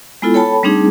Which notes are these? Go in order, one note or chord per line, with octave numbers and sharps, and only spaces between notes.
G#3 B3 E4 F4 A4
A4 C#5 G5 A5 B5
G3 A3 C4 D4 D#4 G#4